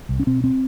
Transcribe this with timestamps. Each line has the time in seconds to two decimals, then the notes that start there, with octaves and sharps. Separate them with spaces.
0.09 C2
0.19 C#4
0.27 B2 C4
0.44 C4